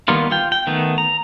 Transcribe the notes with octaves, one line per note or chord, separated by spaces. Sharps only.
D#3 G3 A#3 B3 F4
F4 G5
G5
D#3 A3 B3
A#5